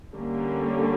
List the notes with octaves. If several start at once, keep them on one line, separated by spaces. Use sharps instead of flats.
D3 G3 A#3 C#4